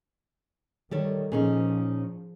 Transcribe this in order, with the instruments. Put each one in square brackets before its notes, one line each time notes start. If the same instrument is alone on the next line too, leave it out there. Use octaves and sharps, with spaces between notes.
[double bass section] D#3 [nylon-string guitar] G3 A4 C#5
[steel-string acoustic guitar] A#2 C#4 D#4 [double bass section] F3 [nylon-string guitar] G#4